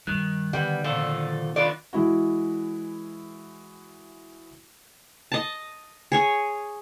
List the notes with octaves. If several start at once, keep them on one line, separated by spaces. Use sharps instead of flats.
G2 D#3 G3 F#6
D3 G3 B3 F#5
A#2 D#3 F3 A4
D3 D#3 F4 B4 D5
E3 G#3 E4 F#4
D#5 A5
G#4 C#5 G#5